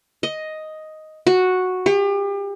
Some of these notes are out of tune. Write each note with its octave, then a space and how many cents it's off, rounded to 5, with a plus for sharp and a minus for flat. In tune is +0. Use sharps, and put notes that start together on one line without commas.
D#5 +5
F#4 -5
G4 +35